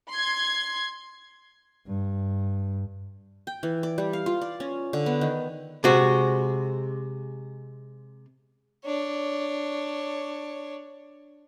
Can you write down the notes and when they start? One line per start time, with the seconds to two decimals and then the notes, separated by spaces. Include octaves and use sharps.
0.11 C6 G#6
1.87 G2
3.47 G5
3.63 E3
3.83 D5
3.98 G3
4.13 F5
4.26 F4
4.41 D5
4.60 C#4
4.93 D3
5.06 B3
5.21 D#3
5.84 C3 G#3 F#4
8.85 D4 C#5